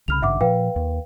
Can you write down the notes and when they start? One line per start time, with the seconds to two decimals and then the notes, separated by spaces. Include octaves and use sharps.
0.08 C2 C#3 B5 F6 F7
0.22 G#1 G2 C#3 E5 F#5 D6
0.41 A#2 F3 B4 F5 G5
0.76 D#2